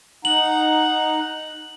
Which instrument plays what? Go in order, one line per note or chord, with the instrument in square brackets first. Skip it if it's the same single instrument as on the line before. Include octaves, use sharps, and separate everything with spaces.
[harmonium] D#4 F#5 A#5 [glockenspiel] F#7